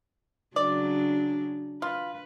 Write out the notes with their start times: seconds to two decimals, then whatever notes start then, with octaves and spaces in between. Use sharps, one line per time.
0.56 C#3 F#3 D4 D5
1.82 F4 B4